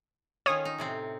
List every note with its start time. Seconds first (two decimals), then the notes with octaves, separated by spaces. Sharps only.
0.46 D#3 C#4 F4 C#5 D#6
0.65 D#4
0.78 A2 C3 C4